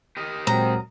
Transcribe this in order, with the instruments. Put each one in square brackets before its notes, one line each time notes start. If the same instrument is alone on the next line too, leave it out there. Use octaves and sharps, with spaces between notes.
[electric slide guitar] G4 A#4 D#5
[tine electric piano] A#2 G#3 [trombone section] F#3 C4 [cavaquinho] A#5